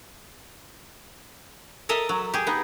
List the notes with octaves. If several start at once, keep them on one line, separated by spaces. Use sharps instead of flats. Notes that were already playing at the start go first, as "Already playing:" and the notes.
A4 A#4 D#5 E5 A5
F#3
G4 G#4
B3 D#4